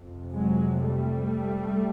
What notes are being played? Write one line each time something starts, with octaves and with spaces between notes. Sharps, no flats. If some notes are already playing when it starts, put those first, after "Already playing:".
Already playing: F2 C3
F#3 G#3
G3 A3